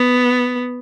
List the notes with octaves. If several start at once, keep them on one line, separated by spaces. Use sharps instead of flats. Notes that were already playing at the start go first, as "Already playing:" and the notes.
Already playing: B3